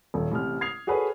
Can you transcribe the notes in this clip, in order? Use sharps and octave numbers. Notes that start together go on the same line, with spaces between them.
D#1
A1 C3 F6
D#6 G#6 C7 F7
F#4 G#4 A4 B4 C#5